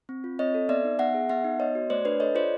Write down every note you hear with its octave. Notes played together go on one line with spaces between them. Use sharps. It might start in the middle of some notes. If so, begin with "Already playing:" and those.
C4
F4
C4 C#5 D#5
A4
B3 D5 E5
D#4
B3 E5 F#5
G#4
B3 E5 F#5
D#4
B3 C#5 D#5
F#4
A3 C5 D5
D4 B4 C#5
A4 C#5 D#5
F4 C5 D5